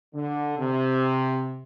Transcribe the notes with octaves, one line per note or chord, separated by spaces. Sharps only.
D3
C3